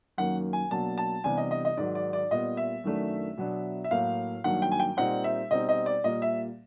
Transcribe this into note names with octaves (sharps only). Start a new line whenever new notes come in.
F#2 D#3 F#3 A#3 F#5
G#5
B2 F#3 A#3 D4 A5
A5
C3 E3 G3 B3 D4 G#5
D#5
D#5
D#5
G#2 D#3 F#3 D5
D5
D5
A#2 G3 B3 D#5
E5
F#2 D#3 F#3 A3 D4
B2 F#3 B3 D4
E5
A2 F#3 A#3 F5
G2 D#3 F#3 A#3 F#5
G5
G#5
G5
A#2 G3 C4 D#4 F#5
E5
B2 G3 C4 D#4 D#5
D#5
D5
A#2 G3 A#3 D#5
E5